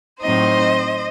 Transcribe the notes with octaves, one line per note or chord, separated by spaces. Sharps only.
A2 F#3 C4 D#4 C5 D#5